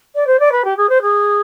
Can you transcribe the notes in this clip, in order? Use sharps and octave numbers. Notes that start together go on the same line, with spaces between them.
D5
C5
D5
B4
G4
G#4
C5
G#4